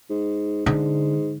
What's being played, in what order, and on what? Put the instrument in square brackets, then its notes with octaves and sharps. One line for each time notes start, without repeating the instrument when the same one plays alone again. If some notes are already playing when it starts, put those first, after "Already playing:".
[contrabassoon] G#2
[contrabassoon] G#2 [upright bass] D3